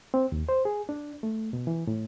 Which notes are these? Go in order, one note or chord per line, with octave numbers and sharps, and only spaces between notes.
C4
D#2
C5
G#4
D4
A3
B2
E3
A2